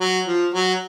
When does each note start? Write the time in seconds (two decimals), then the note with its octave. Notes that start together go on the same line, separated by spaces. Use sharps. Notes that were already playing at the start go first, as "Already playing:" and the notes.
0.01 F#3
0.27 F3
0.54 F#3